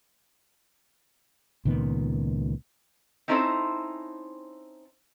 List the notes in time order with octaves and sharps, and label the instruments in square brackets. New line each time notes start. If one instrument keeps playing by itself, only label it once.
[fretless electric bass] C#2 A#2 D#3 B3
[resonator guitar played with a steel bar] C4 C#4 D#4 E4 A4 C5